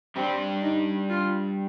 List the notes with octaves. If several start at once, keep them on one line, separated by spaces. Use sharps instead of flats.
G3 C4 D4 G4
D#4
F4